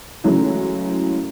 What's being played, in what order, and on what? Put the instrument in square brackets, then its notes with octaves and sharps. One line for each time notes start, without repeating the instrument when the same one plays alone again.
[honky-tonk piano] C#3 E3 F#3 G#3 A3